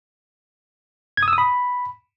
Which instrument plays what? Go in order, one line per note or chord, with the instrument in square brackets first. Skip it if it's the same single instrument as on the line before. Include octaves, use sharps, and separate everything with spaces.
[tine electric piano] G#6
D#6
E6
D#6
B5